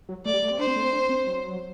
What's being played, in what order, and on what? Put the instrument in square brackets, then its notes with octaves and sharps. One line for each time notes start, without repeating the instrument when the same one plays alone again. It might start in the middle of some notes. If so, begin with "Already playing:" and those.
[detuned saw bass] F#3
[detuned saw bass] A3 [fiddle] D5
[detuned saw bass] G3
A3
C4
[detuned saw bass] D4 [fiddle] C5
[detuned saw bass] C4
A3
C4
D4
C4
F#3